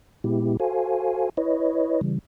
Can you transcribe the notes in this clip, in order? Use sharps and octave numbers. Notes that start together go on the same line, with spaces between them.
A#2 G#3 B3 E4 G4
F#4 A4 C5 F5 G#5
E4 B4 C#5 D#5
C#3 E3 G3